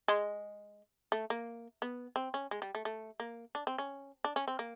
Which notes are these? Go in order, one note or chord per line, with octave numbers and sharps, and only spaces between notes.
G#3
A3
A#3
B3
C4
C#4
G#3
G3
A3
A3
A#3
D4
C4
C#4
D4
C#4
C4
A#3